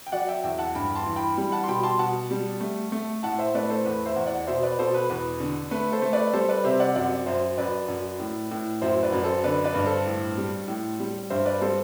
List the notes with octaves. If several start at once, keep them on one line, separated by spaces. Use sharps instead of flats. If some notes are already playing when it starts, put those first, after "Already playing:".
G5
F#3 D5 F#5
E5 G5
E2 E5 G5
F#5 A5
G2 G5 B5
A5 C6
E3
G5 B5
G3 B5
F#5 A5
C6
B2 G5 B5
A5 C6
B2 F#5 A5
G3
A3
A3
A2 F#5 A5
C5 E5
A3 B4 D5
A4 C5
E2 B4
C5 E5
E2
D5 F#5
B2 C5 E5
B4 D5
B2 A4 C5
B4
E2 B4
D3
A3 B4
A4 C5
A3
B4 D5
G3 A4 C5
B4 D5
C3 C5 E5
D5 F#5
F#2 D5 F#5
F#2 C5 E5
F#2 B4 D5
F#2
A2
A2
F#2 C5 E5
B4 D5
F#2
A4 C5
D3 B4 D5
B4 D5
G2
A4 C5
A2
G3
A2
G3
G2 C5 E5
B4 D5
G3 A4 C5